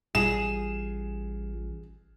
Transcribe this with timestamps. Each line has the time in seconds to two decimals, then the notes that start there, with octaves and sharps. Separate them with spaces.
0.15 A1 G3 F4 G#4 E7